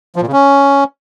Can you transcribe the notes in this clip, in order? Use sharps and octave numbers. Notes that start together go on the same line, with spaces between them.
F3
A#2
C#3
C#4